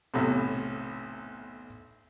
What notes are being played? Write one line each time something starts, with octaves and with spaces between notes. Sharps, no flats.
B1 E2 A2 C3